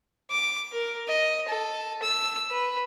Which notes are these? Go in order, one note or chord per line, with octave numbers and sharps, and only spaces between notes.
D6
A#4
D#5
A4
E6
B4